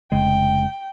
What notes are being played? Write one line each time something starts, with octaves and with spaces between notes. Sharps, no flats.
F1 C#3 G#3 G5